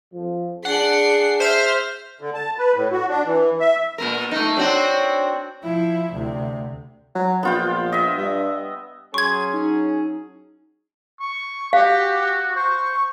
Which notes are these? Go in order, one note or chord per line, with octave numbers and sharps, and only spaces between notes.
F2 F3
D4 G#4 F#5 C7
C5 E5 F6
D3
A5
B4
A2
F#4
D4
E3
E5
A#2 B3 A#4
A3 A#3 D#4
C4 D4 F#4 C#5
F3 E4
D2 C3
F#3
A#1 B3 F4 G5
D#5 E5
G2
F#3 C#4 G#4 C6 C#6 G#6
D#4
C#6
F#4 G4 F5
C5 C#6